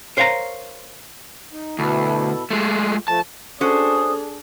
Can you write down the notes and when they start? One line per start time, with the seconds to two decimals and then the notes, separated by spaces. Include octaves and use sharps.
0.17 A#4 C5 C#5 F5 F#5 A#5
1.53 D#4
1.79 D2 B2 E4 A4
2.50 G#3 A3 F4 G4
3.08 F3 A3 A5
3.61 C#4 D4 F#4 G#4 A4 C5 D#6